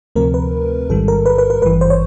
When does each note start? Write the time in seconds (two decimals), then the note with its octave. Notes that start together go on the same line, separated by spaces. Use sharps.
0.16 D2 C3 F3 A3 C4 A#4
0.34 B4
0.89 A1 G#2 D#3 G3 A4
1.08 A#4
1.26 B4
1.38 B4
1.50 B4
1.62 G#1 G2 E3 B4
1.81 C5
1.90 C#5